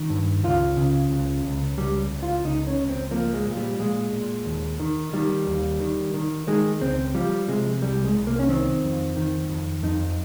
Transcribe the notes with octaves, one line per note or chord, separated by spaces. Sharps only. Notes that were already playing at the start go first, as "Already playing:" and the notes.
Already playing: D#3
G2
C#2 F4
C#3
C#2
C#2
C#2 G3
C#2
F4
C#2 D#4
C#4
C#2
C4
F3 A#3
G#3
A#2
G3
A#2 G#3
A#2
D#2
D#3
D#3 G3
D#2
D#3
D#3
D#3 G#3
C#2 C4
F3 G3
C3 G#3
C2 G3
G#3
C2
A#3
C#4
D#3 C4
F2
D#3
F2
F2 D#4